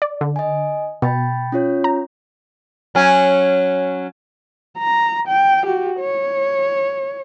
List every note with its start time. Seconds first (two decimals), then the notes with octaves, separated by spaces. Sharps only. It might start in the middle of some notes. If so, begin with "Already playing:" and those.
0.02 D5
0.21 D3
0.36 D#5 G#5
1.02 B2 G5 B5 A6
1.52 C#4 F4 C#5
1.84 A#5
2.95 F#3 C#4
4.78 A#5
5.27 G5
5.66 F#4 G4
5.99 C#5